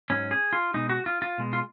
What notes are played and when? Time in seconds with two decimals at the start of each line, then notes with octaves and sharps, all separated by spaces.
0.10 G#2 F#3 C#4
0.31 G#4
0.53 F4
0.74 B2 G#3 D#4
0.89 F#4
1.06 F4
1.22 F4
1.38 B2 G#3
1.53 F4